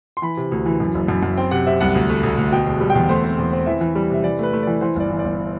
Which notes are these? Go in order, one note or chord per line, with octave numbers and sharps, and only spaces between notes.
C6
E3 B5
C3
D2
E3
F#2
F#1
F#2
F#2
C4 G5
C3 F#5
C3 E5
C2 F#5
D2
A3
D2
D2
B2 G5
E1
G3
E2 G5
A3 C5
C4
E2
C4
E3 E5
E3
G3
C3 E5
E3 D5
A3 B4
A3
E3 D5
E3 C5
G1 D5
E3
G1 D5